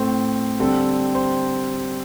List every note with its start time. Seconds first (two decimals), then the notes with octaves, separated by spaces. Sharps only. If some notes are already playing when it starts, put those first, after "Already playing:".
Already playing: A2 A3 C4 C5
0.59 D3 G3 C4 A4
1.15 C5